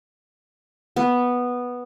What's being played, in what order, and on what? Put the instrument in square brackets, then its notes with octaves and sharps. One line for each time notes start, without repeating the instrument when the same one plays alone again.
[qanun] B3